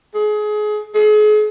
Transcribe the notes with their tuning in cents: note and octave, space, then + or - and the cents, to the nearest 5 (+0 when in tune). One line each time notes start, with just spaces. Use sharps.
G#4 +25
G#4 +40